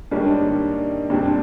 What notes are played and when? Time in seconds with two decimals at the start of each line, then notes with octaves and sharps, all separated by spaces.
0.11 G#2 D#3 G3 A#3 C#4 D4
1.10 A#2 G3 C4 D4